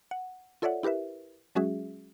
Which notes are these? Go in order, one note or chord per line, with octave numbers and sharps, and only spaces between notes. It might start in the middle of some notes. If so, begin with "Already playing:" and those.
F#5
F4 A4 C#5 D5 E5 F#5
E4 G4 A#4 B4 E5
F#3 G#3 C#4 F#4 G#4 E5